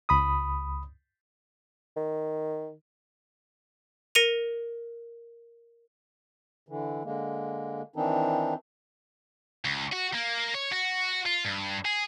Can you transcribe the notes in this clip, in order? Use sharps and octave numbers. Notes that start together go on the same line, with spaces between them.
C#2 B5 D#6
D#3
A#4 A#6 C#7 D#7 F7
D3 E3
D3 G#3 A#3
D#3 E3 C4 D4 D#4
C#2
F#4
A#3
C#5
F#4
F4
G2
G#4